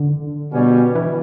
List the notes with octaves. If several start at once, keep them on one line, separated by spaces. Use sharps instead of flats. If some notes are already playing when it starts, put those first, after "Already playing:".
Already playing: D3
B2 G3 C#4
E3